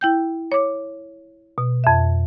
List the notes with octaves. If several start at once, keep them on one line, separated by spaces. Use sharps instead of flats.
E4 G5 G6
C#5 D6
B2
F2 E5